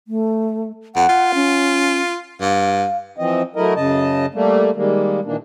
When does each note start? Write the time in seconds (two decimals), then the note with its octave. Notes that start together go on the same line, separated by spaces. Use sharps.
0.08 A3
0.96 F2 F#5
1.09 F4
1.35 C#4
2.41 G2 F5
3.16 E3 F3 C4 D#5
3.56 F#3 A3 E4 A#4 D#5
3.76 F#2 C#3 D#5 A5
4.34 G3 A3 A#3
4.76 D#3 G3 G#3 A#3
5.25 A#2 D#3 E3 A#3 D4